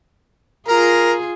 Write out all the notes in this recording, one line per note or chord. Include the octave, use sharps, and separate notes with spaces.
F4 G#4 A#4 A#5